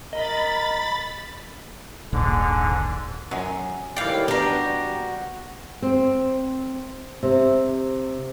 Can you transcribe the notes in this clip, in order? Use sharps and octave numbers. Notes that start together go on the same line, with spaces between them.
A#4 D#5 B5 A6
D#1 A#1 G#2 D3
F#2 F#3 C#4
A2 D#3 E3 G3 D5 F5 G5
G3 B3 D4 F#4 G4 A#5
C4
C3